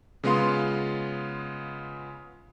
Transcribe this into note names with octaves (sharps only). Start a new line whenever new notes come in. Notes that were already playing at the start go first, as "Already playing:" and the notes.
C#3 G#3 B3 F4 F5 C6